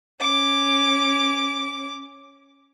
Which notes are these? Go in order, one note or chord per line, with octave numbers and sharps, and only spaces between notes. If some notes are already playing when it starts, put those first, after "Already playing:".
C#4 D6